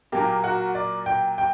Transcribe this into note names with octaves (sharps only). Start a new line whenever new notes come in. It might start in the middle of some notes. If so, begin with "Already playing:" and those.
A#2 F#3 A#3 G4
F#4
D5
G5
G5